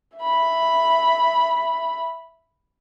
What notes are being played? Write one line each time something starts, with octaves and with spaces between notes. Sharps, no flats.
E5 B5